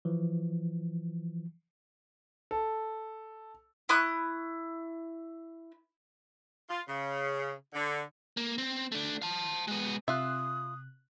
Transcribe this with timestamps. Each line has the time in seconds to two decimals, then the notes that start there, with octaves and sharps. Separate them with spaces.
0.05 E3 F3
2.51 A4
3.89 E4 C#6 D#6 F#6
6.69 F4
6.87 C#3
7.74 D3
8.37 A#3
8.58 C4
8.92 A3 D4
9.22 F5 A5
9.68 G#3 B3
10.08 C3 F4 E5 D#6 F#6